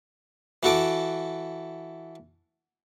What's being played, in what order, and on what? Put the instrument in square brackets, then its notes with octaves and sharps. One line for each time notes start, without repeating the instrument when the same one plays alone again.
[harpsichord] E3 F#4 A4 D6